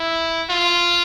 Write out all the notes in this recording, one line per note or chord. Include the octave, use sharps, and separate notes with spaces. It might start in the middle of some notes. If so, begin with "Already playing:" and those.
Already playing: E4
F4